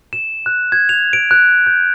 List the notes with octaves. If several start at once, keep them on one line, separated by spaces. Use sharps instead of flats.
E7
F#6
G#6
F7
D7
F#6
G6